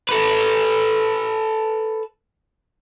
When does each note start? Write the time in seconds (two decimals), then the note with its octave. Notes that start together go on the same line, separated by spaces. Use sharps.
0.09 A4 B4